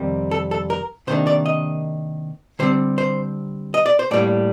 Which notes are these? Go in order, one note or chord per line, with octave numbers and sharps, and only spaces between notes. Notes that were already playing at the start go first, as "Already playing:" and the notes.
Already playing: F2 C3 D#3 G3 C4
A4
A4
A#4
C3 D#3 A#3 D4 C5
D5
D#5
D3 G3 C4 C5
C5
D#5
D5
C5
A2 G3 A#3 D5